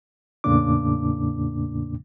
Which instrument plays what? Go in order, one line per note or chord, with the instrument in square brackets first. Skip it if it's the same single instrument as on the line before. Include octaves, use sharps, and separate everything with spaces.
[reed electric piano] E2 A2 C#3 A#3 D4 D6